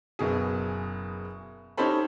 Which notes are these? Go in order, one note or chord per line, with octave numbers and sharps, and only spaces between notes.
F#1 B2 G#4
C#4 D#4 G4 A4 C5 B5